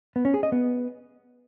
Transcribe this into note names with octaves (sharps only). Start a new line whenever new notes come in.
B3
C#4
G#4
D#5
B3